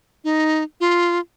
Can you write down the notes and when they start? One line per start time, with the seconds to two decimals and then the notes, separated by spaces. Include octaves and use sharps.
0.24 D#4
0.81 F4